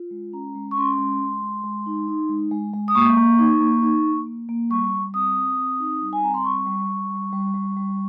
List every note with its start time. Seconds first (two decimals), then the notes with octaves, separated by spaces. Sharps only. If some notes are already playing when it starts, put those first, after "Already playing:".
Already playing: F4
0.11 G#3
0.33 C#4 A#5
0.55 G#3
0.71 C#6
0.77 C#4 C6
0.99 G#3
1.21 G#3
1.42 G#3
1.64 G#3
1.86 D#4
2.08 D#4
2.29 G#3
2.51 G#3
2.73 G#3
2.88 D#6
2.95 A#3 C#6
3.17 A#3
3.39 D#4
3.61 A#3
3.82 D#4
4.05 A#3
4.26 A#3
4.49 A#3
4.70 G3 C#6
4.92 G3
5.14 C4 D#6
5.36 C4
5.57 C4
5.80 D#4
6.01 G3
6.13 G#5
6.23 C4 A#5
6.34 C6
6.44 G3 C#6
6.66 G3
6.88 G3
7.10 G3
7.33 G3
7.54 G3
7.77 G3